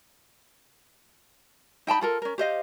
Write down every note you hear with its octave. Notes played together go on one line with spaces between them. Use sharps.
D#4 G5 A5 B5
F4 A4 A#4
C#4 A#4
G4 C5 D#5 F5